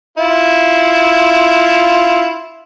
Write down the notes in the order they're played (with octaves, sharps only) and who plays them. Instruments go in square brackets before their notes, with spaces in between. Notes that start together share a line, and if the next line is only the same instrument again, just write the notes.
[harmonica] E4 F4